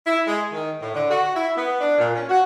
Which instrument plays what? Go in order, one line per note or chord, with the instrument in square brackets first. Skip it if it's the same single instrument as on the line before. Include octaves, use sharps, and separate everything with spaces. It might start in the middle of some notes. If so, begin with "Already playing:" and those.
[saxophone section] E4
G#3
D#3
A2
D3
F#4
E4
B3
D4
A#2
C#4
F#4